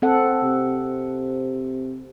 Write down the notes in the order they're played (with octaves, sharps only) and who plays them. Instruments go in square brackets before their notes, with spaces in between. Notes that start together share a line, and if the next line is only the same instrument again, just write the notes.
[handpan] C4 A4 F#5
[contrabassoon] C3